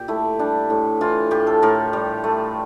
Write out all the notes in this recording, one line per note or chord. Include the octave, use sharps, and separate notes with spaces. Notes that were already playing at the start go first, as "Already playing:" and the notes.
Already playing: A#2 G4
A3 E4
G3 D4
A2
E3 F4
A2 G4
A4
A2 A#4
G3
A3